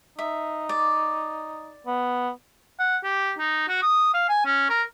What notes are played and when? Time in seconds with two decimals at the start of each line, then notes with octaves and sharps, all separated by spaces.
0.19 D#4 E5
0.69 D5
1.87 B3
2.80 F#5
3.03 G4
3.38 D#4
3.69 F#4
3.83 D#6
4.14 F5
4.29 G#5
4.45 C#4
4.70 A#4